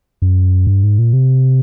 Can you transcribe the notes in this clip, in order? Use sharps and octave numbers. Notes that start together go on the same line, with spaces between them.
F#2
G2
G#2
A#2
C3